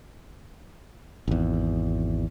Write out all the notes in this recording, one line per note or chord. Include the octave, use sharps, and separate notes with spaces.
G#1 E2